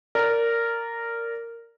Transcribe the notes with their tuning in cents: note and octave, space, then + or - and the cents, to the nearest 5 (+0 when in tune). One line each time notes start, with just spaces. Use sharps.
A#4 -10 D5 -20